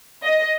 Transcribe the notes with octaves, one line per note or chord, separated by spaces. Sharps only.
D#5